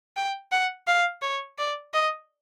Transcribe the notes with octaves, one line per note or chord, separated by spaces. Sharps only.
G5
F#5
F5
C#5
D5
D#5